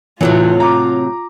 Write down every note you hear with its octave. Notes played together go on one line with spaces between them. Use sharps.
A2 C3 E3 F#3 F4
A#5 D6